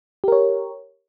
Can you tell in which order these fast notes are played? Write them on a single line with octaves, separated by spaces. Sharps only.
G4 A#4 C#5